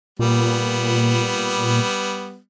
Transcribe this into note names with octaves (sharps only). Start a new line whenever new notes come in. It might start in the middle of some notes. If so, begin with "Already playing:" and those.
A#2 G3 B3